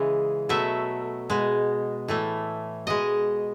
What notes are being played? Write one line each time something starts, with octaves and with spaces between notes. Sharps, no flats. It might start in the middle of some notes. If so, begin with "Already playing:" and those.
Already playing: C#3 E3 G#3 D#5
B2 F#3 A3 E5
B2 G#3
A2 E3 A3
B2 G#3 D#5